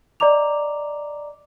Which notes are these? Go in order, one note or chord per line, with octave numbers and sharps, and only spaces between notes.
D5 D#5 A#5 D6 F7